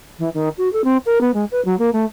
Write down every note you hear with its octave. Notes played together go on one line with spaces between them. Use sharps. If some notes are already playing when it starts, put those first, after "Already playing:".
E3
D#3
F#4
A4
C4
A#4
B3
G#3
B4
F#3
A#3
A3